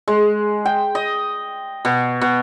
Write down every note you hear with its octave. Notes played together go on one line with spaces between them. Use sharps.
G#3
G5
D#5
B2
B2